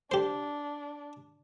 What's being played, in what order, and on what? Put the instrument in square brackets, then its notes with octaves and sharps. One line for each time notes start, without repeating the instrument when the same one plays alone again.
[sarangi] D4 [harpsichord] G4 C5